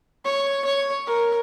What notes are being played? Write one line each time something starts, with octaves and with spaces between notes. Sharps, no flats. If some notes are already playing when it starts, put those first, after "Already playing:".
C#5
C#5
A#4